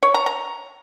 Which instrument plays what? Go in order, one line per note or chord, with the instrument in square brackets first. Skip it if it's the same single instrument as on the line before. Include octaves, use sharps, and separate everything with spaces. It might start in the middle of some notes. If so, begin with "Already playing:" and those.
[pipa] C#5
A#5
A#5